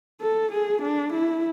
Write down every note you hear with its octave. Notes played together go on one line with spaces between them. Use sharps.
A4
G#4
D4
E4